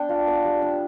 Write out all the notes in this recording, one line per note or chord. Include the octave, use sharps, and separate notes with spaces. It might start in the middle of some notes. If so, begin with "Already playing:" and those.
Already playing: B3 D4 G5
F4
B3
G3
D4